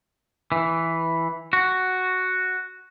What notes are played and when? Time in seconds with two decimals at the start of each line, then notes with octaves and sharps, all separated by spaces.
0.52 E3
1.53 F#4